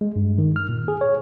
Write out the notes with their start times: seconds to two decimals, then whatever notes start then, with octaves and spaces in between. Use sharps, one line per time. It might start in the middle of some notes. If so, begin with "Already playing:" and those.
0.01 G#3
0.16 G2
0.38 D#3
0.56 F6
0.69 A#2
0.88 G#4
1.01 C#5